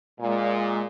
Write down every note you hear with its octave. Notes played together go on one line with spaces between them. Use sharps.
A#2 G#3